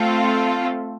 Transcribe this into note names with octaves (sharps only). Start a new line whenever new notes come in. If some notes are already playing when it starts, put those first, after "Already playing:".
Already playing: A3 C4 F4 A4